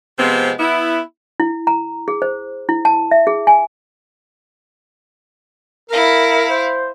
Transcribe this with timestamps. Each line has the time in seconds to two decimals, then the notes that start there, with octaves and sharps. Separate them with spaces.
0.19 C3 F3 G#3 B3 C4
0.59 B3 E4
1.40 E4
1.67 A#5
2.08 G#4
2.22 C5
2.69 E4
2.85 A5
3.11 E5
3.27 G#4
3.47 G#5
5.90 E4 A#4 F5
6.49 C5